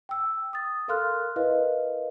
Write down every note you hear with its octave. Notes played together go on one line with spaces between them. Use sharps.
G5 E6
D#6 A6
A4 A#4 F5 C6 F6 F#6
E4 A#4 B4 D#5 F5